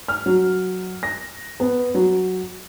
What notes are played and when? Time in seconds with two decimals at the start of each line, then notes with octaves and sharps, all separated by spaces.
0.08 F6
0.26 F#3
1.03 A#6
1.60 B3
1.95 F#3